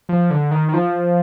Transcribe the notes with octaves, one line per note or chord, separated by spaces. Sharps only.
F3
D3
D#3
D#3
F3